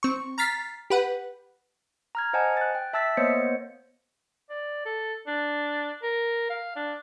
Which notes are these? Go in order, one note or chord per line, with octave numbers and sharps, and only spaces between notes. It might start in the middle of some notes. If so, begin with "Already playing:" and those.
C4 C#6
A#5 F6 A6 B6 C7
G4 B4 F#5
A#5 F6 G#6
C5 D#5 F#5 G#5 A5
F#6 A6
G5
E5 A5 E6 A6 B6
A#3 B3 C5 C#5 D#5 C#7
D5
A4
D4
A#4
F5
D4